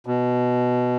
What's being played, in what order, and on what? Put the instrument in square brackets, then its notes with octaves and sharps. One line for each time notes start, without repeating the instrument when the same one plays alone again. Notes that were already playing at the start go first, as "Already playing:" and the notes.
[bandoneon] B2